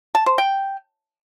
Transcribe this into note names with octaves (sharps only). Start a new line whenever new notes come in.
A5
C5
G5